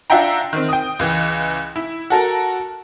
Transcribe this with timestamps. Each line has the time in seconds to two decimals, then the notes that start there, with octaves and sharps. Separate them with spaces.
0.10 D4 F4 E5 F#5 G5 A#5
0.53 D#3 C4
0.69 G5 D#6
0.99 C#2 E3
1.76 E4
2.10 F#4 A4 A#4